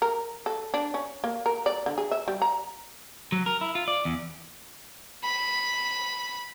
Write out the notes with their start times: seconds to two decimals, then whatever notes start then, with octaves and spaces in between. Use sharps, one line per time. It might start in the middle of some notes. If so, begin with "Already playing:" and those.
0.02 A#4
0.46 A4
0.74 D4
0.94 C#4
1.24 A#3
1.46 A#4
1.66 D5
1.86 D3
1.98 G#4
2.11 E5
2.28 G3
2.42 A#5
3.32 F#3
3.46 A#4
3.61 E4
3.75 F4
3.88 D5
4.05 E2
5.24 B5